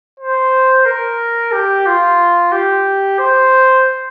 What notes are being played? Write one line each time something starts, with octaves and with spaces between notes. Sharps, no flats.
C5
A#4
G4
F4
G4
C5